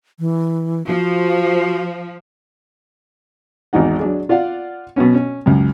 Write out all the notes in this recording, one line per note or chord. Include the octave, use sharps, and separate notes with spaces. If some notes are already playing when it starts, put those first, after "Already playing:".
E3
F3 F#4
G#1 E2 G#3 D#4 F#5
F#3 D4 G#4
F4 D5 F5 F#5
B2 F#3 B3 C#4
C#4
C#2 F#2